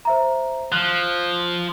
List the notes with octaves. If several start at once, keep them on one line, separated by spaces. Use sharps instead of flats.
C5 E5 A#5
F3 F#6